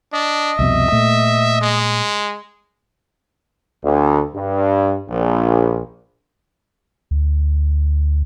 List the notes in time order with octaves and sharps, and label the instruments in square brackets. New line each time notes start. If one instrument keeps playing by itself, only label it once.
[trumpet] D4 [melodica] D#5
[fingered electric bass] C2 F2 B2 [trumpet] E5
[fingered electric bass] A#2 A3
[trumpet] G#3
[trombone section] D2
G2
A#1
[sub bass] D2